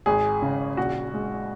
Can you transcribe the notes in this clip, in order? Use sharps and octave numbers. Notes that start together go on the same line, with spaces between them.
G#1 G#4
C#3
A#1 F#4
G#3